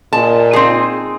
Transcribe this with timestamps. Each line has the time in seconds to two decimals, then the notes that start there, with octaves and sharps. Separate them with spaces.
0.13 A#2 G#3 A5
0.53 C4 D#4 G#4